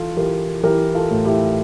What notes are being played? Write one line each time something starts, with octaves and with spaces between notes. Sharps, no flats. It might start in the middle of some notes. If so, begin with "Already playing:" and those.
Already playing: E3 F4 A4
E3 G4 A#4
E3 G4 A#4
F4 A4
A2
E4 G4